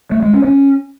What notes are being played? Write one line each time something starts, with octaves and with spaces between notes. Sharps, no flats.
A3
G#3
C#4
C#4